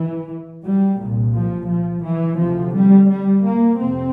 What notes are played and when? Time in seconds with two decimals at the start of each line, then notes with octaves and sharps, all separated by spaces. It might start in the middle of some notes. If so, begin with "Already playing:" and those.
Already playing: E3
0.64 G3
0.99 C2 A#2
1.33 F3
1.68 F3
2.03 E3
2.38 D2 C3 F3
2.74 G3
3.09 G3
3.44 A#3
3.79 F2 C3 C4